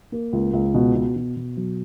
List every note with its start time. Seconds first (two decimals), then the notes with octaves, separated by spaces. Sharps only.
0.12 A#3
0.33 C#2
0.53 C#2
0.74 B2
0.95 B2
1.16 B2
1.36 B2
1.57 F#3